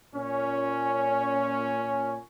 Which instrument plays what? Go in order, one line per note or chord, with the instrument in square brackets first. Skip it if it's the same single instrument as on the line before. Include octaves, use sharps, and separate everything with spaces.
[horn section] A#2 C#4